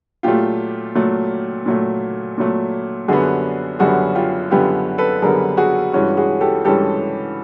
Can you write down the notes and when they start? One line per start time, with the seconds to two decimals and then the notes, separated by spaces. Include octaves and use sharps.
0.23 A#2 F#3 A3 F4 G4
0.95 A#2 F#3 A3
1.66 A#2 F#3 A3
2.38 A#2 F#3 A3
3.08 F#2 D3 G3 B3 F#4 G#4
3.79 F#2 D3 G3 B3 F#4 G#4
4.15 F4 G4
4.51 F#2 D3 G3 B3 F4 G4
4.98 A4 B4
5.22 F#2 D3 G3 B3 G#4 A#4
5.57 F#4 G#4
5.93 G2 E3 G#3 C#4 F#4
6.17 F#4 G#4
6.41 G4 A4
6.65 G2 E3 G#3 C#4 G4 A4